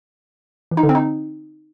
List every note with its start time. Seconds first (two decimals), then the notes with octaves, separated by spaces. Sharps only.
0.71 E3
0.77 D#4
0.83 D3
0.89 C4
0.95 D#4